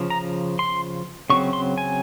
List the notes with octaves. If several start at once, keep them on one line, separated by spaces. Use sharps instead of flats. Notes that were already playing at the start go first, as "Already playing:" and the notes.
Already playing: C#3 F3
A#5
C6
C#3 F#3 C4 C#6
C6
G#5